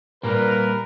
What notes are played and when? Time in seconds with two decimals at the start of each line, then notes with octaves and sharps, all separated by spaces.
0.23 A#2 G3 A#3 D4 A#4 B4